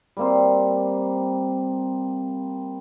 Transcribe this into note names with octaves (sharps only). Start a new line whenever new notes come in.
G3 A#3 C4